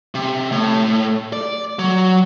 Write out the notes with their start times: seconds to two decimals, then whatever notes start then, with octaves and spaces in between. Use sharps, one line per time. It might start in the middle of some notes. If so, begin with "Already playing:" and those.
0.15 C3
0.52 A2
1.33 D5
1.79 F#3